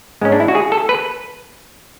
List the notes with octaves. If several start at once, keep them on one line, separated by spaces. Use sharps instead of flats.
G#2 G#3 B3 C#4
D4
E4
F#4
G#4
A4
B4